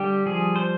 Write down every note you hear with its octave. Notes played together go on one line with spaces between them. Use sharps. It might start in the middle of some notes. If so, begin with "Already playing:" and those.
Already playing: D3 G3 G4
F3 G#4
C5